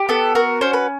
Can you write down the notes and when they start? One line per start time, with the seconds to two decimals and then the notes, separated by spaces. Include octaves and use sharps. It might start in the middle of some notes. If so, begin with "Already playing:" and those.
Already playing: G4
0.09 B3 A4
0.35 F#4 A#4
0.61 C#4 C5
0.73 B4